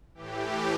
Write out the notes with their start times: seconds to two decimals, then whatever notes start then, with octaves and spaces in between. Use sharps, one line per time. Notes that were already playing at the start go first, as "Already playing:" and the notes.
0.15 A2 E3 G4